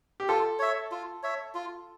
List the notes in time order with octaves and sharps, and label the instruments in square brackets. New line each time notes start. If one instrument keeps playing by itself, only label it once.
[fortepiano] G4
[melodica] F4 [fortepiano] A4
[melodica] C#5 E5
F4
C#5 E5
F4